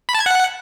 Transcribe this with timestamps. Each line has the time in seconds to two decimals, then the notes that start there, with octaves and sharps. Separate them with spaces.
0.09 B5
0.14 A5
0.20 G#6
0.26 F#5